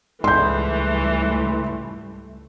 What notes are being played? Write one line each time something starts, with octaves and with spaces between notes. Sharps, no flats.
C#2 G#2 E3 G3 A3 C6 G6